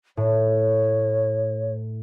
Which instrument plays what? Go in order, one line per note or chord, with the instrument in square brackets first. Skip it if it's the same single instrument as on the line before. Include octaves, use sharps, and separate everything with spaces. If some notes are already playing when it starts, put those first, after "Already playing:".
[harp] A2 [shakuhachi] C#5